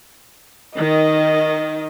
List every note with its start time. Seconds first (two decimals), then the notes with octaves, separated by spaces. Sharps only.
0.76 D#3 D#5